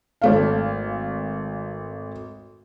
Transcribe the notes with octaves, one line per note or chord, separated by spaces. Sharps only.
G#1 A3 F5